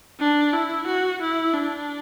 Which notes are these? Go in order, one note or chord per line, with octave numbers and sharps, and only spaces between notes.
D4
E4
F#4
E4
D4